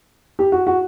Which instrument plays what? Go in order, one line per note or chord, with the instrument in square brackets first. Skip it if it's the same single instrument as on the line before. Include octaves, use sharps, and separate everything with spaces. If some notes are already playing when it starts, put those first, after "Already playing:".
[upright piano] G4
F#4
F#4